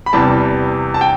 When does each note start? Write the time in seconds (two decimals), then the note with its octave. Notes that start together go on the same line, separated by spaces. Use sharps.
0.06 B5
0.13 E2 C3 E3 G3 A5
0.94 A5
1.01 G5